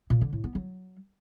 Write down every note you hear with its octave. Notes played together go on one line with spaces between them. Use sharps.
A#2
D3
A2
B3
F#3